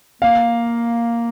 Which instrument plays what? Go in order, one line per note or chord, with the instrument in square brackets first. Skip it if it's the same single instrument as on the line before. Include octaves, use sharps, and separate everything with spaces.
[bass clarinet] A#3 [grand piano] F5